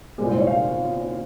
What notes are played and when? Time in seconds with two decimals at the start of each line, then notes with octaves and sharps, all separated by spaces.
0.18 C2 A#2 G#3 C4 G#4
0.28 C5
0.38 C#5
0.47 F5